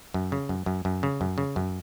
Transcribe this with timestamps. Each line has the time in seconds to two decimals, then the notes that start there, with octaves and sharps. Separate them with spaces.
0.14 F#2
0.32 C#3
0.49 F#2
0.66 F#2
0.85 F#2
1.03 C#3
1.21 F#2
1.38 C#3
1.56 F#2